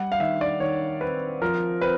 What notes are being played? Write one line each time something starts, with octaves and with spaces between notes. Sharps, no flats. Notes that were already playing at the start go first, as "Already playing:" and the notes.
Already playing: G3 F#5
F5
D#3 E5
D5
D#3 C#5
C4 B4
F3 A#4
C4 B4